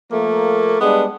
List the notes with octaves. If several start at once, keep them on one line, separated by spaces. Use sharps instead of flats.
F3 A3 A#3
G3 G#3 B3 D4